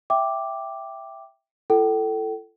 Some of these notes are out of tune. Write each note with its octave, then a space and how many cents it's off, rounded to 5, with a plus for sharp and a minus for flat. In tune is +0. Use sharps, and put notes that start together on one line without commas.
E5 +5 G5 +0 D6 +0
F4 -45 A4 +0 G5 -40